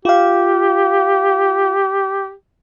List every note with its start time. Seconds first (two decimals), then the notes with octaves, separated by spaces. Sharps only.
0.05 F4 G4 F5